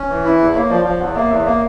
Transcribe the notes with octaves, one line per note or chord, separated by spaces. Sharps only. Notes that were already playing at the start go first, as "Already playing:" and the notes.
Already playing: C#4
E3
E4
E2 B4
A#3 C#5
F3 D5
F3 F5
E2 F#5
A#3 E5
E2 E5
A#3 E5